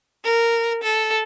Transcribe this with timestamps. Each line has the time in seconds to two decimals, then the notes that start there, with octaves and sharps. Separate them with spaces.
0.24 A#4
0.83 A4